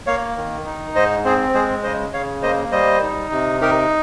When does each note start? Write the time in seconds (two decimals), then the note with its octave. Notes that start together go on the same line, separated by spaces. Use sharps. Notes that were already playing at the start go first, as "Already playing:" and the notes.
0.07 A#3 C#5 F5
0.36 D#3
0.66 D#4
0.95 G#2 C5 D#5
1.24 C4 G#4 C5
1.54 G#3 G#4 C5
1.83 C#3 C5 D#5
2.13 C#3 C#5 F5
2.43 A#3 C5 D#5
2.72 G3 C5 D#5
3.02 D#4
3.31 C3
3.61 D#4 G4 A#4